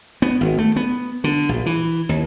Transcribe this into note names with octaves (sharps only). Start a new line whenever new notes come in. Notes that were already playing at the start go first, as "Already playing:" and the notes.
B3
G#1
A3
B3
D3
A#1
E3
D#2